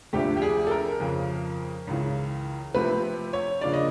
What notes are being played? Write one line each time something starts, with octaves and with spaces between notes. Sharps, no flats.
D2 C3 F3 A3 D4 G4
G4
G#4
A4
A#4
F2 C#3 F3
C#2 C#3 E3
C3 F3 A3 C4 B4
C#5
C#3 F3 A#3 D4 D5
D#5